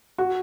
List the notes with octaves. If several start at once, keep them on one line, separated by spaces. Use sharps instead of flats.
F#4